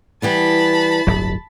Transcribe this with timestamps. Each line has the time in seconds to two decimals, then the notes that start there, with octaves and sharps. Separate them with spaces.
0.22 E3 G3 B3 A5 B5
1.07 D1 G1 F#3